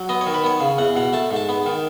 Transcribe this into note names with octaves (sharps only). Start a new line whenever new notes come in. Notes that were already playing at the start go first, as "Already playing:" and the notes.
Already playing: F#3
B3 D#5
C#5
D#3
B4
B3 C#5
C#3
E2 F#5
B2 F#5
A3 A5
G#2
A5
B3
D#3